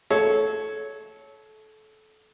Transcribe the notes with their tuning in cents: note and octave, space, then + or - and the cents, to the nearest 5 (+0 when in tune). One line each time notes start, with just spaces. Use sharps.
A4 -25 C#5 +0